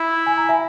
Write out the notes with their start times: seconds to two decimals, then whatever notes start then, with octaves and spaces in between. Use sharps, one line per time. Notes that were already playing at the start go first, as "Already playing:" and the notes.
Already playing: E4
0.27 G#5
0.38 A#5
0.49 E5 G#5